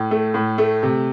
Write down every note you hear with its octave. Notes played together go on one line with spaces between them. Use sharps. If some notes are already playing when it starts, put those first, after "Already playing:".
Already playing: A2
A3
A2
A3
C3